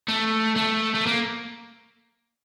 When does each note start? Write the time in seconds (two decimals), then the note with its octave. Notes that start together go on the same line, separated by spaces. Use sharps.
0.08 A3
0.56 A3
0.94 A3
1.06 A#3